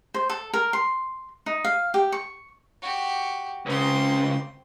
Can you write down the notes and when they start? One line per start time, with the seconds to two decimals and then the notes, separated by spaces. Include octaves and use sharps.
0.14 C5
0.30 A4
0.54 A#4
0.73 C6
1.46 D#4
1.65 F5
1.94 G4
2.12 C#6
2.82 F#4 G4
3.66 C#2 C#3 C4 C6